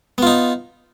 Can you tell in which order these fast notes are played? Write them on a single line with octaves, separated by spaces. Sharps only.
B3 F4 D#4